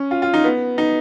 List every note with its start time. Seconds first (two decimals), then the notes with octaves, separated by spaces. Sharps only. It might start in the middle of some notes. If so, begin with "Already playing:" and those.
Already playing: C#4
0.11 F4
0.22 F4
0.34 D#4
0.44 B3
0.78 D#4